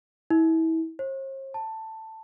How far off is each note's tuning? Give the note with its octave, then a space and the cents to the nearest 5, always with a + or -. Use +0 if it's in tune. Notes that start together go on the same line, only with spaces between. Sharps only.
E4 -30
C5 +45
A5 +10